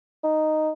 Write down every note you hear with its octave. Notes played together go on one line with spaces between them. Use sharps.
D#4